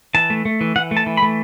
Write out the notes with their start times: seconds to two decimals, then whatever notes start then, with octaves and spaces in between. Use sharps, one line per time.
0.15 E3 A5
0.30 A3
0.45 A3
0.61 E3
0.76 E3 F#5
0.91 A3
0.97 A5
1.07 E3
1.17 B5
1.22 A3